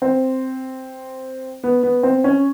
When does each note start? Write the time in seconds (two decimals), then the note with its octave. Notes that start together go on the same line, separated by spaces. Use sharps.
0.02 C4
1.64 B3
1.83 B3
2.03 C4
2.24 C#4